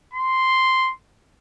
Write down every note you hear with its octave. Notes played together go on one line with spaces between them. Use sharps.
C6